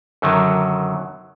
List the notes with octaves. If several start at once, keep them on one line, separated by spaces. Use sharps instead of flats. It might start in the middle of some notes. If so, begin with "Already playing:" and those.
F#2 D3 D#3 F#3